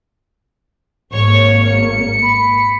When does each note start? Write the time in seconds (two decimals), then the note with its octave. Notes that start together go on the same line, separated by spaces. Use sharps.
1.13 G#1 A#3 C#5 C#6
1.67 C#7
2.23 B5